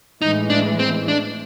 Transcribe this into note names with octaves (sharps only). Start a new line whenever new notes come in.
A2 E3 G#3 D#4
D4
C4
D4